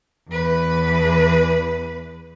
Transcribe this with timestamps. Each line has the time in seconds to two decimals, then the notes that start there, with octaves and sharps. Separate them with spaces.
0.28 E2 B4